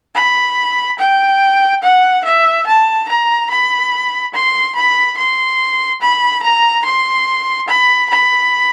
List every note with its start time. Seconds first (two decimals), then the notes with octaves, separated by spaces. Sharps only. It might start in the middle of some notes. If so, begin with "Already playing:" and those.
0.15 B5
0.99 G5
1.83 F#5
2.25 E5
2.67 A5
3.09 A#5
3.50 B5
4.34 C6
4.76 B5
5.17 C6
6.01 B5
6.43 A#5
6.85 C6
7.68 B5
8.10 B5